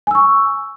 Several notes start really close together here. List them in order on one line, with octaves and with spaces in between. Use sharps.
G#5 E6 C#6